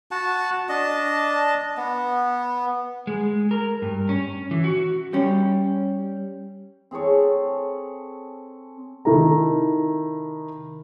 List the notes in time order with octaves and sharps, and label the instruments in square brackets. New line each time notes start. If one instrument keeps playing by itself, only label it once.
[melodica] F#4 F#5 A5
D4 D#5 A5
B3
[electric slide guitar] G#3
A#4
G2
C#4
E3
F#4
[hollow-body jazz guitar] G3 C#4
[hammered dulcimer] C4 G#4 A4 C#5
[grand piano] C3 D#3 E4 A4 A#5